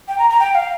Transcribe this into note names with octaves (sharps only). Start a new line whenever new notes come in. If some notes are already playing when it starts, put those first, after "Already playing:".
G5
A#5
A#5
G5
F5